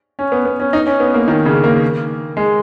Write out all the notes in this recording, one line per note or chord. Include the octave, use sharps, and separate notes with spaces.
C#4
B3
B3
C#4
D#4
C#4
B3
A#3
D#3
C#3
A#3
G#3